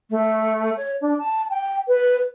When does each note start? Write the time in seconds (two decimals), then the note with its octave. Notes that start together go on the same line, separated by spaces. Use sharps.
0.10 A3
0.76 C#5
1.01 D4
1.18 A5
1.49 G5
1.87 B4